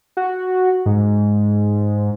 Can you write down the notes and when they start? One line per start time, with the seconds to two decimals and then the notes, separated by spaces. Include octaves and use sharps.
0.17 F#4
0.86 G#2